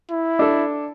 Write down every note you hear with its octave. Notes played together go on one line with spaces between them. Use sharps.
E4
D4 A4